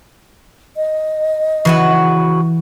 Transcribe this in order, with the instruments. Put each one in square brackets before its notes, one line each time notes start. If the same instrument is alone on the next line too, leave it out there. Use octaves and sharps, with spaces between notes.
[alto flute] D#5
[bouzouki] C#3 F#4 B4 [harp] E3